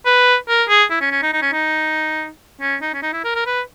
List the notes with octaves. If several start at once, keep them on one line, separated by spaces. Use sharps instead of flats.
B4
A#4
G#4
E4
C#4
C#4
D#4
D#4
C#4
D#4
C#4
D#4
C#4
D#4
E4
A#4
A#4
B4